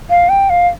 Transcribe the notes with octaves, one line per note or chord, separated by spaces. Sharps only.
F5
G5
F5